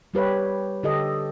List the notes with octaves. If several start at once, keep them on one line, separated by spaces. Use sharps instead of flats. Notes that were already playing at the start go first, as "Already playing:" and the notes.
G3 G4 B4 C#5
D3 G4 A4 D#5